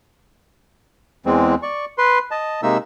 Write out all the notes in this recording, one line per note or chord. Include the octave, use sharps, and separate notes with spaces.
E2 E3 G#3 C4
D5 C#6
B4 C6
D#5 A5
C3 G#3 A#3 D#4 E5 E6